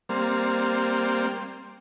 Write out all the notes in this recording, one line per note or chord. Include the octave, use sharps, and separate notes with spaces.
G3 A#3 C4